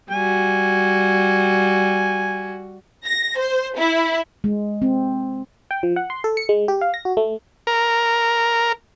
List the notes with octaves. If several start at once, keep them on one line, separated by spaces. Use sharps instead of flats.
G3 F#4 G#5
A#6
C5
E4
G#3
C4
G5
F3
F#5
C6
A4
C#7
G#3
G4
F5
A#6
F#4
A3
A#4